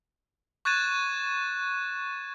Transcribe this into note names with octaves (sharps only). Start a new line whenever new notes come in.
C#6 F#6 G#6 A6 D#7 E7